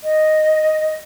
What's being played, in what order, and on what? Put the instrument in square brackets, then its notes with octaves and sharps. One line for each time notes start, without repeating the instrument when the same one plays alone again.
[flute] D#5